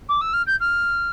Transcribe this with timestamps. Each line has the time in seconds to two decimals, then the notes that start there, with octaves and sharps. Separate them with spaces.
0.09 D6
0.21 E6
0.33 F6
0.47 G6
0.60 F6